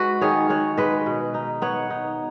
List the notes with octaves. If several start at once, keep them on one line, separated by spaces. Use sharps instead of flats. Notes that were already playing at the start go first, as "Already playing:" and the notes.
Already playing: G#3 F#4 B4
D#3 G#4 C#5
D#3 C#5 F#5
G#3 B4 D#5
B2
D#4
B3 C#5 F#5
D#4